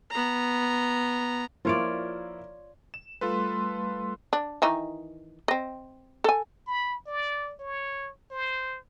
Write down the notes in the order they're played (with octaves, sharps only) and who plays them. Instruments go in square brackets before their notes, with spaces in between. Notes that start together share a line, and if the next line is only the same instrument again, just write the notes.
[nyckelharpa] B3 A#5
[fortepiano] F3 A#3 E4 [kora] F4 C#5 D5
[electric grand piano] E7
[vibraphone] G3 A3 C6 [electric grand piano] F4 A4 B4
[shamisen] D4
D#3 E3 D#4
C4 D#5
A4 G#5
[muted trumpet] B5
D5
C#5
C5